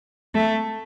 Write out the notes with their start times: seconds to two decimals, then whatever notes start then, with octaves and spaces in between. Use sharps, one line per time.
0.35 A3